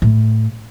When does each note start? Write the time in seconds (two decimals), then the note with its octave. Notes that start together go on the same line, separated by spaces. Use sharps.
0.02 A2